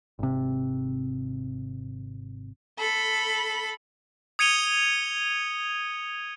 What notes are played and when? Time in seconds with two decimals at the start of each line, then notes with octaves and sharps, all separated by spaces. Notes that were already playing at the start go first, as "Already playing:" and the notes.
0.19 G#1 C3
2.79 A4 B5
4.39 D#6 G#6 C#7 D#7 F7 G7